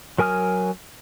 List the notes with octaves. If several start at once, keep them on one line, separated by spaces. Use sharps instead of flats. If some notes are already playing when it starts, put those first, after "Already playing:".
F#3 A#4 G#5 D#6 F6